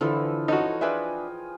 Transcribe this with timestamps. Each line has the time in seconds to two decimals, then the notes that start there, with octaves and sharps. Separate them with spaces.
0.01 D3 E3 F3 A4 B4
0.48 D#4 F#4 A4 C#5
0.81 D4 F4 G#4 B4 E5 G5